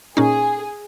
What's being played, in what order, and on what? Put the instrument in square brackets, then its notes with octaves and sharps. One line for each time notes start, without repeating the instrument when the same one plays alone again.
[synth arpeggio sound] A#2 C#4 D#4 [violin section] G#4